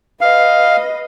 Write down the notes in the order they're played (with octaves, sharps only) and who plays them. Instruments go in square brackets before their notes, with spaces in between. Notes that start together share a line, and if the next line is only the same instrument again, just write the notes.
[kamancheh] B4 D#5 [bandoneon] F5